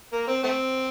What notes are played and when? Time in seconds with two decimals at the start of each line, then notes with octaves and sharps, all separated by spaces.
0.13 A#3
0.28 C4
0.43 A3 C4